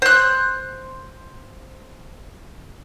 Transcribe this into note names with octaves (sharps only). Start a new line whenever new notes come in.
C5 F#6